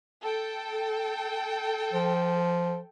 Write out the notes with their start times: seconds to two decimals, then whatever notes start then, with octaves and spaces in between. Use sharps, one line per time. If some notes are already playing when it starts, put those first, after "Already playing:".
0.22 A4 G5
1.93 F3